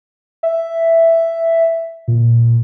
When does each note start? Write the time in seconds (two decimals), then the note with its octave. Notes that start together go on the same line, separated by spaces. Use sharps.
0.43 E5
2.08 A#2